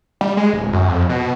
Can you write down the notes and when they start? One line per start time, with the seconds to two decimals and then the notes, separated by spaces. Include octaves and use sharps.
0.21 G3
0.37 G#3
0.53 D1
0.73 F#2
0.88 F2
1.09 B2